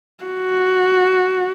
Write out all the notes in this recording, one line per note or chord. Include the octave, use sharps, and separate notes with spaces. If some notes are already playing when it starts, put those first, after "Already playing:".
F#4